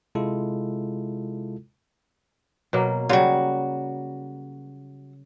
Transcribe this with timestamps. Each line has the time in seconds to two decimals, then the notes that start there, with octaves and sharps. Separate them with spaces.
0.15 C3 G#3 E4 F4 A4
2.73 B2 F#3 A#3
3.09 C#3 F#3 G3 F4 F#4